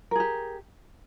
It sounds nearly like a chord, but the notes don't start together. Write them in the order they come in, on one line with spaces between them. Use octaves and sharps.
A#4 G#4 G4